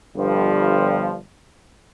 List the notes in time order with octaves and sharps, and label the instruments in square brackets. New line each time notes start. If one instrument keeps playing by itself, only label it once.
[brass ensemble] G1 G2 F3